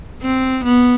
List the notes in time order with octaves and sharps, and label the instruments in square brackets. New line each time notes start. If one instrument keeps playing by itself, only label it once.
[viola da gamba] C4
B3